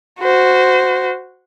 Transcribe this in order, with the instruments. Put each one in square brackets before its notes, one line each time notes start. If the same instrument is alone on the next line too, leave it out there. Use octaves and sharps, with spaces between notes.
[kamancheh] F#4 C5